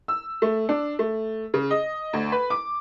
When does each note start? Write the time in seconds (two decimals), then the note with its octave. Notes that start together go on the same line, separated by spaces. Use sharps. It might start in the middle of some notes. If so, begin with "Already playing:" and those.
0.08 E6
0.42 A3
0.69 D4
0.99 A3
1.54 C#3
1.70 D#5
2.13 D2
2.32 B4
2.50 D6